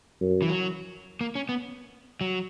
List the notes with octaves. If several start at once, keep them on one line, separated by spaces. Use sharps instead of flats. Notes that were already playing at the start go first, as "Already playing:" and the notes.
F#2
E3
F#3
A#3
C#4
B3
F#3